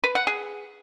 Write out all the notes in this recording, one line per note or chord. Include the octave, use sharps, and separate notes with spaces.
B4
F#5
G#4